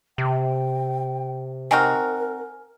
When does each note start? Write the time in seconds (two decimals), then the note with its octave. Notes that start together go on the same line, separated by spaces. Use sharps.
0.18 C3 G5
1.71 C4 D#4 F#4 A#4 G#5 F6